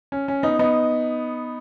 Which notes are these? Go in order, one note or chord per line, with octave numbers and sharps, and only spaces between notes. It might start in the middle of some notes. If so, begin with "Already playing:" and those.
C#4
C#4
B3 D#4
B3 D#4